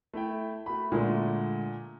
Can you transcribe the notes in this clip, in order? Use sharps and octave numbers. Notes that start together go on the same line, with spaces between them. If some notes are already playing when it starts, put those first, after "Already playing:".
A3 E4 G5
A3 F#4 B5
A#2 D3 G#3 A3